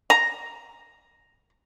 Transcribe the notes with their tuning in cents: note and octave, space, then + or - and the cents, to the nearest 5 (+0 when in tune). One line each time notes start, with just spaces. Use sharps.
A#5 +0